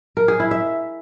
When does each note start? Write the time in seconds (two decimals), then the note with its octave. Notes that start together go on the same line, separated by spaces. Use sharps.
0.17 A#4
0.28 G#4
0.40 E4
0.51 E5